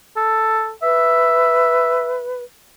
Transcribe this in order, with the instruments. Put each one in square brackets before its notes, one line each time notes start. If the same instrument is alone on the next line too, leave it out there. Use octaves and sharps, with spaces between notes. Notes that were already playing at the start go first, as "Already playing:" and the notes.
[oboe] A4
[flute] B4 [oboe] E5